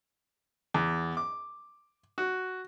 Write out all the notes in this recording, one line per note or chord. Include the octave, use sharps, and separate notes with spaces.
E2
D6
F#4